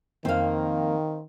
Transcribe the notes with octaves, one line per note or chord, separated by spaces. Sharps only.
F2 D#3 A#3 C4 F5